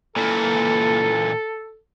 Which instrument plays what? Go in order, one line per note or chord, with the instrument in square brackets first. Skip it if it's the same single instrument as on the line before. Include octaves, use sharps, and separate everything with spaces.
[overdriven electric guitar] A#2 E3 [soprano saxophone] A4